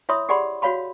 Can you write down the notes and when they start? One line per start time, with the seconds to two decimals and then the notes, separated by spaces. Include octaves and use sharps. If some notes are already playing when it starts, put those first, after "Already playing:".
0.09 E4 C#5 E5 B5 C6 D#6
0.29 G4 G#4 D5 F#5 B5 C6
0.62 F#4 C#5 F5 B5 C6